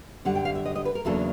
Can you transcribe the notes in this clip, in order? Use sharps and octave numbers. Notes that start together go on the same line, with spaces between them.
F#2 D3 G3 F#5
G5
F5
E5
D#5
D#5
B4
A#4
E2 C#3 F#3 A#3 D4 A4